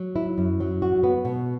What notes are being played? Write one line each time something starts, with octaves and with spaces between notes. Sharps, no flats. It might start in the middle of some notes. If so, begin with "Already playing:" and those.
Already playing: F#3
E4
F#2
F#3
F#4
B3
B2